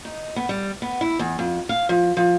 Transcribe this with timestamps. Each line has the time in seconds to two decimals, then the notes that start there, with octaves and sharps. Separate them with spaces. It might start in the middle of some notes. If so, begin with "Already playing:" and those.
0.05 D#4
0.36 B3
0.49 G3
0.82 B3
1.01 E4
1.19 E2
1.39 F2
1.69 F5
1.89 F3
2.17 F3